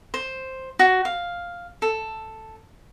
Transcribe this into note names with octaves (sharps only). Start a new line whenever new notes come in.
C5
F#4
F5
A4